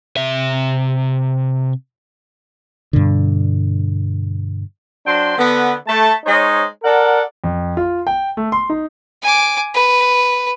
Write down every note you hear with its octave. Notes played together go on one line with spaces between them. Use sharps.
C3 E5
G2 B2 D3
F#3 D4 C5 G5 C6
D3 B3
A3 A5
G#3 D#4 C5 C#5
A4 A#4 D5 F#5
F2
F4
G5
A3
C6
D#4
G#5 D6
B4